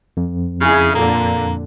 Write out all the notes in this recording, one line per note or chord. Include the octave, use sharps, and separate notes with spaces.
F2
C#3 E4 G#4
A#2 D3 A#3